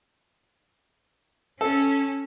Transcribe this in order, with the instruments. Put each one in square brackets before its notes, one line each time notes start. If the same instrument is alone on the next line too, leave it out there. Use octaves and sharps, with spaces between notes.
[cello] C#4 [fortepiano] A4